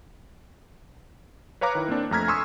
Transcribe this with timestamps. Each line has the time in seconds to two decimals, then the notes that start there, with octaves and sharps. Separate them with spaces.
1.61 B4 C#5 F5 A#5 D6 F#6
1.75 D#3 E4
1.88 A#3 C4 D4
2.11 F2 A3 A#5 F6 G#6 B6
2.28 G#5 C6 C#6 D#6 E6 G#6